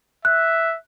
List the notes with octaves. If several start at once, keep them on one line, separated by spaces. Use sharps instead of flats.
E5 F#6